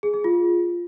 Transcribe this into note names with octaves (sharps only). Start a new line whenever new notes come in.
G#4
G#4
F4